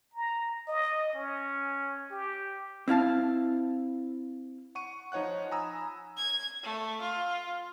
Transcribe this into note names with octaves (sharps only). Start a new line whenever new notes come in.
A#5
D#5
C#4
G4
C4 E4 F5 A5
F#5 C#6 D#7
F3 D#4 C#5 F#5 F#6
G#5 A#5 B5 D#6 E6
G#6
A3
F4